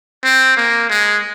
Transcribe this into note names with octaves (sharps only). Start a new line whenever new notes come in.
C4
A#3
G#3